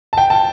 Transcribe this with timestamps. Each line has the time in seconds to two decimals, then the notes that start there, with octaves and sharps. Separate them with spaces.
0.13 A5
0.18 G5
0.30 A5